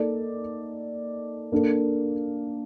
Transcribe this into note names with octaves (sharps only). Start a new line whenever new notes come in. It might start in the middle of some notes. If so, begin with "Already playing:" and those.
Already playing: A#3 D#4 A4 D5
A#3 D4 A4